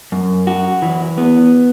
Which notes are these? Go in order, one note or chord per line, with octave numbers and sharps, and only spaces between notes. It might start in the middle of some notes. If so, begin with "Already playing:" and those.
F#2
F#4
E3
B3